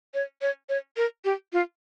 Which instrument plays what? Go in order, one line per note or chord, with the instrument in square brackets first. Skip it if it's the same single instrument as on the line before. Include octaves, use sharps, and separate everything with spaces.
[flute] C#5
C#5
C#5
A#4
G4
F4